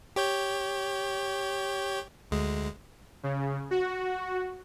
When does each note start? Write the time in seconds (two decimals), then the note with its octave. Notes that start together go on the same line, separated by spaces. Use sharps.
0.16 G4 C#5 G6
2.31 D2 G#3
3.23 C#3
3.71 F#4